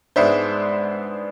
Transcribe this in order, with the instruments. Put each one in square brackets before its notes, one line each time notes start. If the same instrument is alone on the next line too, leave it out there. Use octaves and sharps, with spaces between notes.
[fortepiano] G#2 G#3 B3 D4 C5 E5